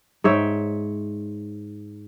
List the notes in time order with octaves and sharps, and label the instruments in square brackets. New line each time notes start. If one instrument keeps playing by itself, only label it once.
[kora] G#2 C#5 E5 G5